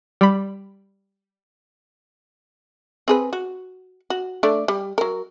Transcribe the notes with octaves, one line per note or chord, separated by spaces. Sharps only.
G3 B5
C4 G#4 B4
F#4
F#4
A3 D4 D5
G3
F#3 A#4